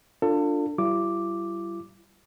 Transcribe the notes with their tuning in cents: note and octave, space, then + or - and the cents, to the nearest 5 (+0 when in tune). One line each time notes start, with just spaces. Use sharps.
D4 +0 F4 +0 A4 +30
G3 -30 E4 +45 D6 +0